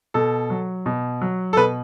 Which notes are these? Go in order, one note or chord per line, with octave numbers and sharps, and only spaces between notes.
B2 A4
F#3
B2
F#3
A4
B2 B4